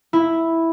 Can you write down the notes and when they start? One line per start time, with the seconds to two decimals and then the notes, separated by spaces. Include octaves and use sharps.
0.13 E4